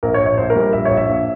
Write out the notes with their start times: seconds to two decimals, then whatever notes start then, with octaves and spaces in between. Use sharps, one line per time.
0.03 A#1 A#4
0.14 C#5
0.20 A#1
0.26 C#5
0.38 A#1 C5
0.50 A#4
0.56 G3
0.61 A#4
0.73 A#1 E5
0.85 C#5
0.91 A#1
0.97 E5
1.09 A#1